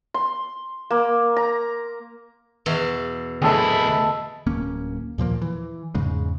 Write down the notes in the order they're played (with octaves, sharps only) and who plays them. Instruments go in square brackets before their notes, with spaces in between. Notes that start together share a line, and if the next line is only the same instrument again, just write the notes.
[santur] C6
A#3
A#5
[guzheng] E2 B2 E3
[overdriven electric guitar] D2 E4 [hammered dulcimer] G#4 A4 D#5
[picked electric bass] D1 A#3 C#4
D#2 A#2 F3 A#3
E3
E2 G#2 C#3 G#3